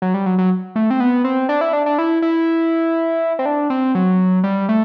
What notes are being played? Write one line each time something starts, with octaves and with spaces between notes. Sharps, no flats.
F#3
G3
F#3
F#3
A3
C4
B3
C4
D4
E4
D4
D4
E4
E4
C4
D4
C4
F#3
G3
A3